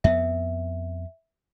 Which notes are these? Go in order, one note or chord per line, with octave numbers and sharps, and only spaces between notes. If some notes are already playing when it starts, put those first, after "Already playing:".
F2 B3 E5